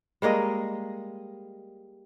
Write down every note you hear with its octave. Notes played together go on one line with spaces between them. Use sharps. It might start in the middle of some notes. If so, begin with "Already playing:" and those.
G3 G#3 A#3 D#5